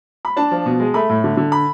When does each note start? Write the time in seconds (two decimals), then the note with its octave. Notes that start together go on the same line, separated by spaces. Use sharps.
0.25 B5
0.36 D4 A5
0.51 F3
0.66 B2
0.80 G#3
0.94 A3 B5
1.09 A2
1.24 D3
1.37 D3
1.52 B5